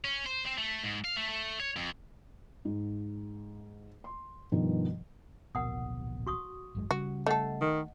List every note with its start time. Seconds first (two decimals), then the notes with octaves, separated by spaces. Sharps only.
0.04 C#4
0.26 C5
0.45 C4
0.58 A3
0.84 G#2
1.05 F5
1.17 A3
1.29 A3
1.60 C#5
1.76 F2
2.65 G#2
4.04 C6
4.52 G2 B2 D#3 F3
5.55 D1 A#1 B2 A#4 F#5 D#6
6.27 F#4 C#6 D#6
6.75 G#1 F#2 G#3
6.91 C#3 G3 F#4
7.26 A3 A4 D#5 F#5
7.61 D#3